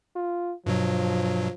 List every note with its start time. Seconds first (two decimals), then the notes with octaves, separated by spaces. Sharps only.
0.16 F4
0.66 G2 B2 F3 F#3